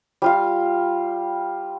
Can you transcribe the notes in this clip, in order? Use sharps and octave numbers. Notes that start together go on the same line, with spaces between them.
G3 F4 F5